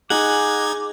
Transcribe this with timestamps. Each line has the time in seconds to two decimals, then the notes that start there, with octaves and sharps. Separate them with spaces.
0.10 D#4 G#4 F#5 D6 G#6